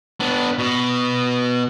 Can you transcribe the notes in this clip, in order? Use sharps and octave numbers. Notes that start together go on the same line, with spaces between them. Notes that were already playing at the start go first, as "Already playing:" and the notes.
B3 D4
B2